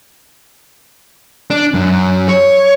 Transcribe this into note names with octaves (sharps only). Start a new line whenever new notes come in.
D4
F#2
C#5